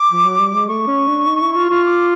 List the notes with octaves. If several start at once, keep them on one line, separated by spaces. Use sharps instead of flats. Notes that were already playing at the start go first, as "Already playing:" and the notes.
Already playing: D6
F3
F#3
G3
G#3
A3 C#6
C#4
D4
D#4
E4
F4
F4
D6